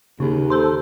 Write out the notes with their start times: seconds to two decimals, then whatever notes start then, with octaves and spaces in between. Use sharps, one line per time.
0.20 D#2 C#3
0.50 A4 C5